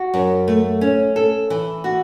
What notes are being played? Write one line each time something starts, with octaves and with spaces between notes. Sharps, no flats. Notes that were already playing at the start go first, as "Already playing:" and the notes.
Already playing: F#4
F#2
A3
C#4
A4
E3
F#4